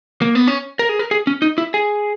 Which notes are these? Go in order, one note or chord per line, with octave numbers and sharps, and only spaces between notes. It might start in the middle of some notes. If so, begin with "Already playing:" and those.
A#3
B3
C#4
A#4
G#4
A#4
G#4
C#4
D#4
E4
G#4